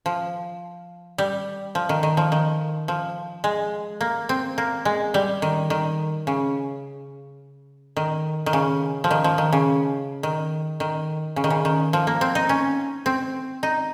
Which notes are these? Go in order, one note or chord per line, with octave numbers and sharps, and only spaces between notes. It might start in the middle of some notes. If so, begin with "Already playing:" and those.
F3
G3
F3
D#3
D#3
F3
D#3
F3
G#3
A#3
C4
A#3
G#3
G3
D#3
D#3
C#3
D#3
D#3
C#3
F3
D#3
F3
D#3
C#3
D#3
D#3
C#3
D#3
C#3
D#3
F3
A#3
C4
D#4
C#4
C4
D#4